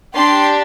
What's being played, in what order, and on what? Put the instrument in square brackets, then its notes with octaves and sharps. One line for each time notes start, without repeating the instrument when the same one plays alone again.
[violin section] D4 G4 C6